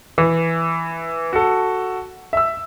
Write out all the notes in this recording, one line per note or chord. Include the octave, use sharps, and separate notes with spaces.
E3
F#4 A4
E5 E6